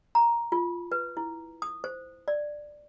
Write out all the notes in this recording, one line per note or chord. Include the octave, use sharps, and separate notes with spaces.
A#5
F4
B4
E4
D#6
C5
D5